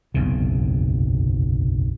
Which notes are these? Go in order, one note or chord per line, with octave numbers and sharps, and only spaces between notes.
F#1 B1 E2 C3